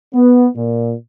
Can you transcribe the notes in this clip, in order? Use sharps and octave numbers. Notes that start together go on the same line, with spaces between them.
B3
A#2